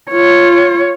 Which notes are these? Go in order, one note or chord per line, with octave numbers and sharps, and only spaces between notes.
F4 C#5